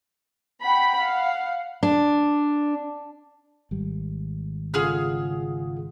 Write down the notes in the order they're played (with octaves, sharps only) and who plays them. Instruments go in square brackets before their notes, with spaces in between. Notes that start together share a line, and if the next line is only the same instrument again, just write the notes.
[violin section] F#5 G5 B5
F5 F#5
[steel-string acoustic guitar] D4
[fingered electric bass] G#1 G3
[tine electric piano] C#3 F4 F#5 [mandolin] G#4 F6